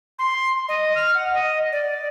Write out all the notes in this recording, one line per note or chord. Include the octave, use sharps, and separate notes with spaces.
C6
D#5
F6
F#5
D#5
D5